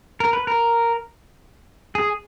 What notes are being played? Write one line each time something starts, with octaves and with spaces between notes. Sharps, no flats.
A#4
B4
A#4
G#4